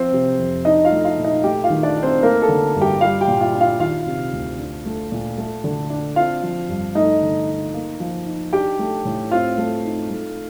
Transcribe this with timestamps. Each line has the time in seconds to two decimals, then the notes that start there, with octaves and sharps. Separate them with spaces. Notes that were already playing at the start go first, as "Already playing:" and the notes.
Already playing: F3 C4 C5
0.12 C3
0.39 F2
0.65 D4 D#4 D#5
0.85 F4 F5
0.92 A3
1.04 F4 F5
1.18 A#2
1.24 D#4 D#5
1.44 A3 G4 G5
1.64 F4 F5
1.70 D#3
1.83 D4 D5
1.96 D#4
2.03 C4 C5
2.23 A3 A#3 A#4
2.42 A4
2.49 D3
2.75 G2
2.82 G4 G5
3.01 G3 F4 F5
3.21 G4 G5
3.28 A#2
3.41 F4 F5
3.54 D4
3.61 F4 F5
3.80 D#3 F4 F5
4.07 C3
4.33 D2
4.59 D4
4.85 A3
5.12 A#2
5.38 A3
5.64 D3
5.90 D4
6.16 C4 F4 F5
6.43 F3
6.69 G2
6.95 A3 D#4 D#5
7.22 D3
7.47 D#4
7.74 A#3
8.00 F3
8.26 D#4
8.53 D4 G4 G5
8.79 A3
9.05 A2
9.31 C4 F4 F5
9.58 A3
9.84 D#4
10.10 A3